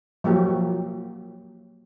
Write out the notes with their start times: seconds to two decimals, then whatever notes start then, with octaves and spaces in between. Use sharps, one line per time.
0.24 F3 F#3 A#3 G4